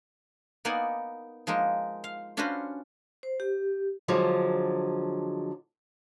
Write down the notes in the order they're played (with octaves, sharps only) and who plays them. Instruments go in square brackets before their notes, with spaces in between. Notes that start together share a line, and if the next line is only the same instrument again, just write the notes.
[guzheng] A#3 B3 D#4 D5 F#5 G#5
F3 G#3 A#3 D#4
F5
C#4 D4 F4 F#4 B4 C5
[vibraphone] C5
G4
[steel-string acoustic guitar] D3 F3 F#3 G#3